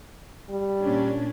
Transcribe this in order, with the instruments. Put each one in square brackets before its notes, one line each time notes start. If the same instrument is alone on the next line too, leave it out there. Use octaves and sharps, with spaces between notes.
[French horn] G3
[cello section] A#2 C#4 D4